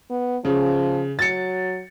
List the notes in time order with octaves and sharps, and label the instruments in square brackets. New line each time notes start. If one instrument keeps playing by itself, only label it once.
[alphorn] B3
[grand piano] C#3 [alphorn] F3
[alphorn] F#3 [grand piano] A6 C#7